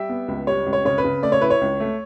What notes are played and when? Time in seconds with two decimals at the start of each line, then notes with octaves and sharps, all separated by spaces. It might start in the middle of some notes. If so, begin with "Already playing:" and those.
Already playing: G3 E5 G5
0.09 B3
0.28 C#2
0.47 G3 C#5
0.66 C#2
0.73 C#5
0.85 C#3 C#5
0.98 B4
1.04 C#3
1.22 A3 D5
1.32 C#5
1.41 E4 B4
1.50 C#5
1.61 C#2
1.80 A3